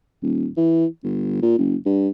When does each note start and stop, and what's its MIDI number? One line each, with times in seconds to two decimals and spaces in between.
0.23 0.47 27
0.57 0.86 52
1.04 1.39 31
1.42 1.58 46
1.58 1.76 30
1.86 2.08 43